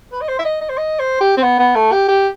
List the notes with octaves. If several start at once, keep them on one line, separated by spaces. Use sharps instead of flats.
B4
D#5
C5
E5
D#5
D#5
C5
D#5
C5
G4
C4
B3
B3
A3
G4
G4